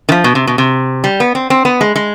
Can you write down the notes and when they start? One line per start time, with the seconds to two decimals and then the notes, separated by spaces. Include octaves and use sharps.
0.09 D#3
0.12 F3
0.24 B2
0.35 C3
0.47 B2
0.58 C3
1.04 G3
1.20 B3
1.35 C4
1.50 C4
1.65 B3
1.81 G#3
1.96 G#3